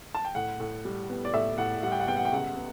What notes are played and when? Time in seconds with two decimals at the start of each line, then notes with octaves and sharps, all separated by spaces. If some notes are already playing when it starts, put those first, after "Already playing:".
0.15 A5
0.25 G5
0.35 A2 F#5
0.60 A2
0.85 G3
1.10 B3
1.25 D5
1.33 A2 E5
1.58 A2 F#5
1.83 G3 F#5
1.92 G5
2.00 F#5
2.07 B3 G5
2.17 F#5
2.25 G5
2.32 C#2 F#5
2.56 B3